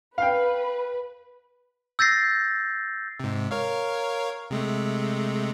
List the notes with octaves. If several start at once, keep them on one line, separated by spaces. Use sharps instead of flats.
B4 F5 G5
E6 G6 A6 A#6 C7
G#2 C3
A#4 C#5 F5
C3 G#3 A3